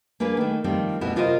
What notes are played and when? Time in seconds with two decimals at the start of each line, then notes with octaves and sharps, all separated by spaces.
0.20 A#3 D4 G#4 B4
0.37 D#3 A3
0.64 D#3 F3 G3 C4 F4
1.01 D2 B2 B3 E4
1.16 C3 F4 A#4 C5 D#5